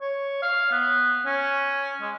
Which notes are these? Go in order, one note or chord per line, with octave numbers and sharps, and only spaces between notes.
C#5
F5
B3
C#4
G#3